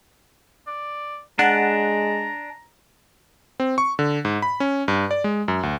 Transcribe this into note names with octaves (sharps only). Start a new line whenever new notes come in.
D5
G#3 D4 F#5 A5 A#5
C4
C#6
D3
G#2
B5
C#4
G2
D5
G#3
F#2
D2